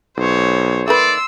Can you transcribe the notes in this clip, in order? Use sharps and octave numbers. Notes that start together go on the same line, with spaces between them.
B1 C5 C#5
D#3 A3 B4 D5 C6 E6